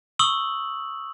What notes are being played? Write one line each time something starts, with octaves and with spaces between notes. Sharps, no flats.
C#6 D#6 E6 F#7